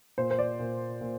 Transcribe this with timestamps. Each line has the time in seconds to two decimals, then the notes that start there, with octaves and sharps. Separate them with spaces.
0.18 A#2 C5
0.31 C5
0.39 D5
0.60 A#2
1.01 A#2